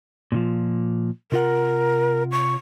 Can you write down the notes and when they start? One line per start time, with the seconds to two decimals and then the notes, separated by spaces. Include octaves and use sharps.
0.32 A#2 D#3 F3
1.32 C3 F4 A#4 F#5
2.32 C#6